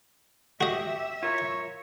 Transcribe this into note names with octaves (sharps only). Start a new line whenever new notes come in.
F#4 G4 D#5 E5
F4 A#4 C#5